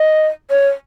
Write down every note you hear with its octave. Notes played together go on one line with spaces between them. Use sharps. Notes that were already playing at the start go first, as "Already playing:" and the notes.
Already playing: D#5
C#5